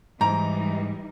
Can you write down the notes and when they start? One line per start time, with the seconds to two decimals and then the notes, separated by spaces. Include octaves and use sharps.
0.21 G#2 E3 G3 D#4 A#5